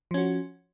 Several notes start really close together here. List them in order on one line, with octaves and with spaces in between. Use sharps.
F3 C#4 F#4